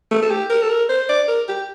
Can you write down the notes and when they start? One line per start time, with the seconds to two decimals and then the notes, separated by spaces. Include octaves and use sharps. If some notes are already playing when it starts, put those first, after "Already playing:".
0.11 A3
0.23 A4
0.30 G4
0.50 A#4
0.62 A4
0.70 A#4
0.89 C5
1.09 D5
1.28 A#4
1.48 G4